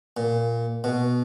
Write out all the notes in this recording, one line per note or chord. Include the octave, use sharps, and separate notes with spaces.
A#2
B2